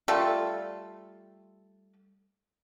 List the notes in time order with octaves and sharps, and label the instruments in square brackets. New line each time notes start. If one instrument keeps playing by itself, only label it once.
[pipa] G3 A3 F4 A4